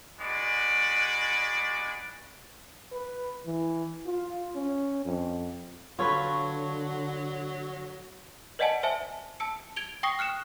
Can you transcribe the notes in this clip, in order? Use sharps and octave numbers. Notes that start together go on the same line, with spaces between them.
G#3 D4 F#4 B4 D5
B4
E3
F4
C#4
F2
D3 F#3 F4 A4 B4 C#5
B4 D5 D#5 F#5 G#5 A5
C5 E5 G#5 A5
A5 E6 C#7
G#6 D7 F7 G7
G5 C#6 D#6 A#6 C7 C#7
F6 F#6 C#7 E7